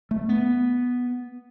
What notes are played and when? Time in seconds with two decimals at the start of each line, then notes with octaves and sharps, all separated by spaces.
0.11 A3
0.29 B3